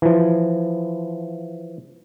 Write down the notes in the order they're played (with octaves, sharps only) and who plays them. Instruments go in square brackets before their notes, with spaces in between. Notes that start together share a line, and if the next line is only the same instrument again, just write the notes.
[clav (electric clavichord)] E3 F3